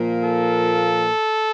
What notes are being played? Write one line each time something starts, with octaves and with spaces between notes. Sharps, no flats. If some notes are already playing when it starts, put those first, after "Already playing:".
Already playing: A#2 F3 A#3
A4